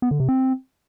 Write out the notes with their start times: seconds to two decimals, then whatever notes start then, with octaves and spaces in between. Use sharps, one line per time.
0.02 B3
0.11 D3
0.20 C3
0.29 C4